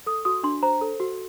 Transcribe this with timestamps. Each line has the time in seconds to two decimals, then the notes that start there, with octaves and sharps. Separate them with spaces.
0.06 A4 D#6
0.25 F#4 D#6
0.43 D4 C6
0.63 C5 A#5
0.81 A4
1.00 F#4